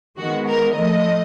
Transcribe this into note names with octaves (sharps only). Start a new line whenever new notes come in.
D#3 G#3 B3 F#4
A#4
A2 F3 A3 D#5